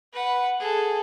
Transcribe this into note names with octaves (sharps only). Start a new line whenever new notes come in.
B4 F#5
G#4 A4